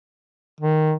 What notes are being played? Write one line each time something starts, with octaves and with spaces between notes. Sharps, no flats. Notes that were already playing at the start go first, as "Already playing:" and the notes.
D#3